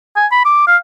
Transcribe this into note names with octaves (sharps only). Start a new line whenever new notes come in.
G#5
B5
D6
F5